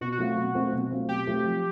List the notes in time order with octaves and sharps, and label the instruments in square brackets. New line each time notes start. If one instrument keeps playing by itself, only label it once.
[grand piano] B2 [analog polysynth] F#4
[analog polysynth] F#4
[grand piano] F#3 A3 C4 F4
B2
F#3 A3 C4 F4
B2
F#3 A3 C4 F4
[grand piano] B2 [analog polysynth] G4
[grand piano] F#3 A3 C4 F4
F3